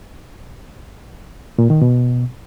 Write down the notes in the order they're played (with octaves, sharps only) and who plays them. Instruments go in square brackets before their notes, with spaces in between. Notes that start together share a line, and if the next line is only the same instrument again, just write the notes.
[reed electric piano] A#2
D#3
B2